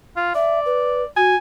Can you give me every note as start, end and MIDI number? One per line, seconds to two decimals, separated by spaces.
0.16 0.30 65
0.35 1.05 74
0.35 0.60 76
0.66 1.04 71
1.17 1.35 66
1.17 1.37 80